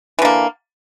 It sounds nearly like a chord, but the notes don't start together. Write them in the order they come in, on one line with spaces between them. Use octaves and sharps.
E3 D3 A#3